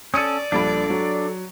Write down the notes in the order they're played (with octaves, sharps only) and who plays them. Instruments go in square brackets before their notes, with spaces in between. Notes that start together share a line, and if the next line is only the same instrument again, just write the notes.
[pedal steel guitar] C#4 A4 [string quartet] D5 [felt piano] D#6 C#7 D#7
[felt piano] A#1 G3 B5 [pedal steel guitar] D4 [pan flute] A4
[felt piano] F#3